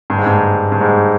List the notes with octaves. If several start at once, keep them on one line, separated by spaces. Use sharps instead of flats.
G2
G#2
G2
G2
G#2